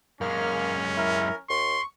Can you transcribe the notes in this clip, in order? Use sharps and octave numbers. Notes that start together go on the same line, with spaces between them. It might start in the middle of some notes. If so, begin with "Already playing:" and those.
F#2 G#3 A#3 C#4 F6
E4 A#4
D#2 C6 C#6